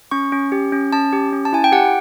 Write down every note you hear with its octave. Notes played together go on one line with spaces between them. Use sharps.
C#4 C#6
C#4
G4
C#4
C#4 A5
G4
C#4
A5
E4 G#5
G5
G4 F#5